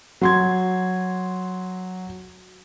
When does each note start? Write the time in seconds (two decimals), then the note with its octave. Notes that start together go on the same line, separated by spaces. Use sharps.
0.21 F#3 C6 G#6